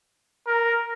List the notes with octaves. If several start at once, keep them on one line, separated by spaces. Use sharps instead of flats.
A#4